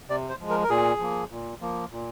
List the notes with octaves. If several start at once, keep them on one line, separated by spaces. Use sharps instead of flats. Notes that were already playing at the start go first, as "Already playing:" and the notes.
C3 D5
C5
F3 G#3
A#4
A#4
A#2 G#4
F3 A#3
A#2
F3 A#3
A#2